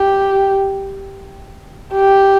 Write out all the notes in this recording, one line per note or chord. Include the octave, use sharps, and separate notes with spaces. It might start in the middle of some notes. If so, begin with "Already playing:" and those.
Already playing: G4
G4